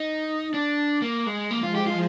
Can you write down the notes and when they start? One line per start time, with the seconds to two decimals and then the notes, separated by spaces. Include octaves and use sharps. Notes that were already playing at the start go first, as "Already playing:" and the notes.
Already playing: D#4
0.54 D4
1.02 A#3
1.27 G#3
1.51 F3 G#3 A#3
1.63 F4
1.75 G4
1.87 F4